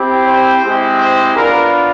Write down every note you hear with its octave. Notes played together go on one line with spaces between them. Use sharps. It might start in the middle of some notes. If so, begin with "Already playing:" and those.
Already playing: C4 E4 G4
C5
G#3 C4 E4 G4
C5
B3 D4 F4 A#4